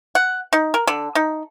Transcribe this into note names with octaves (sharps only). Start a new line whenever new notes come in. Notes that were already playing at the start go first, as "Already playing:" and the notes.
F#5
D#4
A#4
D3
D#4